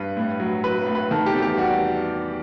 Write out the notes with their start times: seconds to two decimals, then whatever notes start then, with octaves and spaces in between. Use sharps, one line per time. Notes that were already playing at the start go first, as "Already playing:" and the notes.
Already playing: G2 B4
0.17 A2
0.40 F#3
0.63 F#3 B4
0.86 A2
0.95 B4
1.11 D#3 A4
1.26 G4
1.34 E2
1.42 G4
1.58 G3 F#4